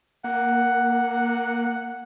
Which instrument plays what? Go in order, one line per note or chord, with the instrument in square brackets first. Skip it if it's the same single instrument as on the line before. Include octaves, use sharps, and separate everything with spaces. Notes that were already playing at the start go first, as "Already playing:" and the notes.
[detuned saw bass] A#3 [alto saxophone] F#5